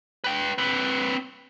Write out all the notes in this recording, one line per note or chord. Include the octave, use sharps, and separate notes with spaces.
B4 G5
C4 B4